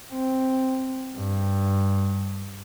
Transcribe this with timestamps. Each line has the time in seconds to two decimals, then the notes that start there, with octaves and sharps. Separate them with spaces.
0.13 C4
1.16 G2